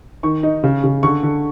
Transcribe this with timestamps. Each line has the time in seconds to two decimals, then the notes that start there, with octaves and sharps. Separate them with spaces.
0.23 D#3 C#6
0.43 D#4
0.64 C#3
0.84 C#3
1.03 D3 C#6
1.23 D3